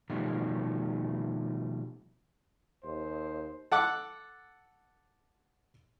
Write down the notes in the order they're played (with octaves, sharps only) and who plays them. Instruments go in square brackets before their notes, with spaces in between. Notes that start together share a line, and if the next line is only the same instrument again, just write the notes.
[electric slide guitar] B2 D#3 F3 G3 A3
[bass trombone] D#2 [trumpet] C5
[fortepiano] A4 F#5 D6